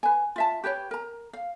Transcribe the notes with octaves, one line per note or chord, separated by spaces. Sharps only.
B4 G#5
F4 E5 A5
G4 B4 C#5 G5
A#4 A#5
F5